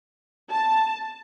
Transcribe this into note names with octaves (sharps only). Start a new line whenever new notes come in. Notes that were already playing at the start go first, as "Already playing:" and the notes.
A5